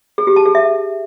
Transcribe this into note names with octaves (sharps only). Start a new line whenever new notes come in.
G#4
G4
A5
G#4
E5